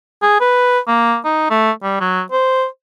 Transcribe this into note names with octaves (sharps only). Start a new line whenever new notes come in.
G#4
B4
A#3
D#4
A3
G3
F#3
C5